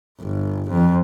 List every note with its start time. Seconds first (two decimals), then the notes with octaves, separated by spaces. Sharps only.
0.20 G1
0.71 F2